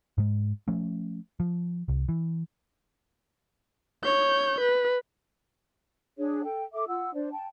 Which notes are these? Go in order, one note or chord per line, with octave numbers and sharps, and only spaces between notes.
G#2 G#3
F3 A3 C#4
F3
C2
E3
C#5 G6
B4
D4 G#4 C#5
A4 G5
A4 E5 D6
F4 F#5 E6
D4 C5 D5
G5 A5